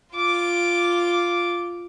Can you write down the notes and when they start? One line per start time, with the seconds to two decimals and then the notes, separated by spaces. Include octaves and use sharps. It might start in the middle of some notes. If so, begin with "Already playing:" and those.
0.14 F4 D6